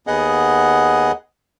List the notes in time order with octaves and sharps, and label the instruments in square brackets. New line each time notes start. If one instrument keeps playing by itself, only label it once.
[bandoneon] D#2 B3 G#4 D#5 F#5